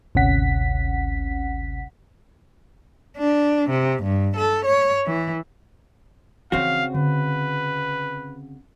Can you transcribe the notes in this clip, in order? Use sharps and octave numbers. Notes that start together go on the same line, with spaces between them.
G#1 D2 C3 C#4 F#5 B6
D4
C3
G2
A4
C#5
E3
C#3 E3 F3 C4 F#4 F5
D3 B4